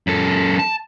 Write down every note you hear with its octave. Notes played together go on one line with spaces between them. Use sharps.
F#2 A4
A5